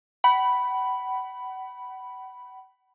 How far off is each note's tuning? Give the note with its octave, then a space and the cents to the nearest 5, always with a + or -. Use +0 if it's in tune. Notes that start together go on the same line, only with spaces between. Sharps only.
F#5 +40 B5 +0